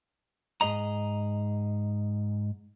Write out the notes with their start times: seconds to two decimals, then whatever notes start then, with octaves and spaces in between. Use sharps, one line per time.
0.61 G#2 G#4 D#5 A#5